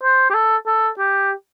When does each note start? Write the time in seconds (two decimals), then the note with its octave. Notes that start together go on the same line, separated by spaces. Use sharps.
0.03 C5
0.30 G4
0.34 A4
0.66 A4
0.98 G4